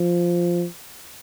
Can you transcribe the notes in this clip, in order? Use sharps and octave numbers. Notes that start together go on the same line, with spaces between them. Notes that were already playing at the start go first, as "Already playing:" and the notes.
Already playing: F3